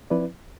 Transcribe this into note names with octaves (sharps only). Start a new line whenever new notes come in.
F3 C4 E4 B4 D5